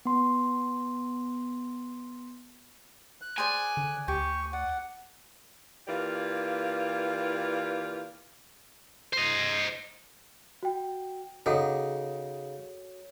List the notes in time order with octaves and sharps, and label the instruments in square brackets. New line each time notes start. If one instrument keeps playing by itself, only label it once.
[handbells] B3 C6
[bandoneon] F#6
[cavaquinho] G#4 C5 D5 [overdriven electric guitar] G#5
[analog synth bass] D3
[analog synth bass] D2 [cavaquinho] G4 [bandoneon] C#6
[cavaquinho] D5 [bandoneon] F#5
[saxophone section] E3 A#3 F4 G4 D5
[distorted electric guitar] C5 D#5
[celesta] F#4 G5
[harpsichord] C#3 D#4 [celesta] F#4 C#5 [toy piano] G#4 A4 F#5